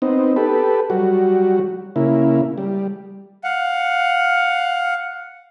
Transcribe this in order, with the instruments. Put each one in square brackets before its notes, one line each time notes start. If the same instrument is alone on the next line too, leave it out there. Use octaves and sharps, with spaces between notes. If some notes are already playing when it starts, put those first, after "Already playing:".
[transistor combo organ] B3 C4 D#4
G4 A4 B4
F#3 G3 F#4
C#3 A#3 E4
G3
[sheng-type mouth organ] F5 F#5